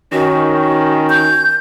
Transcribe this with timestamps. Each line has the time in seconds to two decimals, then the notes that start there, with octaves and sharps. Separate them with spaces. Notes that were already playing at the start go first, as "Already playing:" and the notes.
0.12 D#3 C#4 F#4
1.10 G6